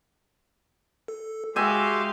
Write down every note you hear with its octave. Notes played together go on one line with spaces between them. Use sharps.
A4
G#3 F#4 G4 E5 F5 G#5 C6 G6